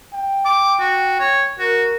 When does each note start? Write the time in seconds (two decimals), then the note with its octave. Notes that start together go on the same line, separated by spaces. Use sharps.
0.13 G5
0.45 D6
0.80 F#4
1.20 C#5
1.59 F#4 A#4